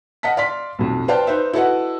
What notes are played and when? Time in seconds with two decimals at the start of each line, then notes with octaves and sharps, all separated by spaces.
0.23 D#5 F5 F#5 A5 B6
0.37 D5 F5 C6 B6
0.79 B1 F2
1.08 B4 C5 D5 F5 G5 A5
1.27 D#4 B4 C5 E5
1.53 E4 F#4 A4 B4 D#5 F#5